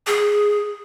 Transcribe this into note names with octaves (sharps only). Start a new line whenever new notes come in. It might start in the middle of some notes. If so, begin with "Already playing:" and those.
G#4